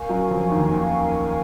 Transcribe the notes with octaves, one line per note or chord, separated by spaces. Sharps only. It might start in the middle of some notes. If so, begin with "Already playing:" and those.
Already playing: A#4 F5 G#5 C#6
F#2 F#3
F2 F3
D#2 D#3
D#2 D#3